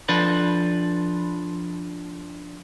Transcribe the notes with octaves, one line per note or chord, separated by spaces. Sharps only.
F3 D4 A4 B4